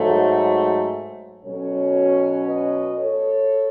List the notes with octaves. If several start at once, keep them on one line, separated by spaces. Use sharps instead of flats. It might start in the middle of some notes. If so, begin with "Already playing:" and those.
Already playing: G#2 F#3 A3 A4 C#5
B2 F#3 C#4 A4 C#5
B4 D#5
A4 C#5